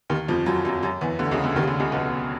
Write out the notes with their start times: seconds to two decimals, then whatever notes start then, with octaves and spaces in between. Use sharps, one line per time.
0.10 D#2 D#3
0.28 F2 F3
0.46 F#2 F#3
0.65 F#2 F#3
0.82 F#2 F#3
1.01 E2 E3
1.19 D2 D3
1.31 C#2 C#3
1.44 D2 D3
1.56 D#2 D#3
1.62 C#3
1.67 D2 D3
1.80 C#2 C#3
1.92 B1 B2